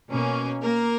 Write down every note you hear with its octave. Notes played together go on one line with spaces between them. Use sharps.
B2 A#3 C#4
A#3 A#4